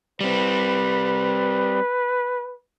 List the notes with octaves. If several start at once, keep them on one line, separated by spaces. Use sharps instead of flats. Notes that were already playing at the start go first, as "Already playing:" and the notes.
G3 C4 B4